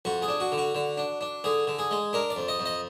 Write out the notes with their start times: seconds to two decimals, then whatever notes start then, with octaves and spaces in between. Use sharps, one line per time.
0.05 F2 F#4
0.22 G#4
0.28 D4
0.40 F#4
0.52 D3
0.58 F#4
0.75 D3
0.97 D4
1.21 D4
1.44 D3 G#4
1.67 D3
1.79 G#4
1.91 G#3
2.13 D4 A#4
2.30 D5
2.36 F2
2.48 D#5
2.59 F2
2.65 D#5